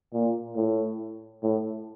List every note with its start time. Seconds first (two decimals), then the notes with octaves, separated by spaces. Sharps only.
0.13 A#2
0.56 A2
1.43 A2